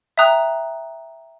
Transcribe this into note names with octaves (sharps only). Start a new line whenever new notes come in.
E5 G5 A#5 D#6 F#6